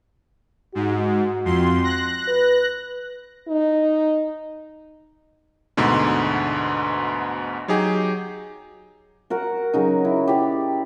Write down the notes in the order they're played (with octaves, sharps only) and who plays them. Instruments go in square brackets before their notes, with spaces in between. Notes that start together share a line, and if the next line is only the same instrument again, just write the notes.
[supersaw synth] G#2 [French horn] F#4
[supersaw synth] F2 C6
F#6 A#6
[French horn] B4
D#4
[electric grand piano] D2 G#2 B2 D3
F#3 D#4 G4 G#4
[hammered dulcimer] F#4 A#4 F#5
C#3 F#3 D#4
E4
G4 D5